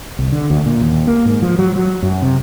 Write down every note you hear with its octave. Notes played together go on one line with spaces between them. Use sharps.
C2
D3
D2
A#2
D#2
A#3
G#2
F3
F#3
F#3
F#2
C3